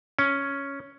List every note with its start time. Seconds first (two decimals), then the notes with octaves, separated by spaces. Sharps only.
0.19 C#4